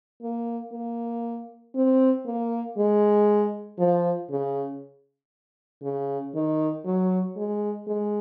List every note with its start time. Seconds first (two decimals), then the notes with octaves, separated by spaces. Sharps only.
0.22 A#3
0.72 A#3
1.75 C4
2.25 A#3
2.77 G#3
3.78 F3
4.30 C#3
5.83 C#3
6.35 D#3
6.85 F#3
7.36 G#3
7.87 G#3